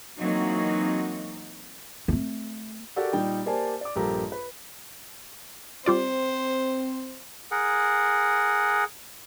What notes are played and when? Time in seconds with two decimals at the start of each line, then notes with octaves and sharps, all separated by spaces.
0.18 E3 F#3 A#3 C4 D#4 F#4
2.08 A3 C4
2.96 F#4 G4 A4 A#4 D5 F#5
3.13 A#2 G3 D#4 G5
3.46 A#3 G4 C5 D5 G#5 A5
3.81 D5 D6
3.96 A#1 G2 A#3 G4 A4 A#5
4.32 B4
5.86 G3 C4 F4 C5 D5
7.51 G#4 A#4 F#5